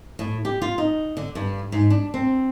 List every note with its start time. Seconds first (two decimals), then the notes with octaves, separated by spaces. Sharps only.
0.19 A2
0.45 G4
0.62 F4
0.78 D#4
1.17 D3
1.35 G2
1.72 G#2
1.90 D4
2.14 C4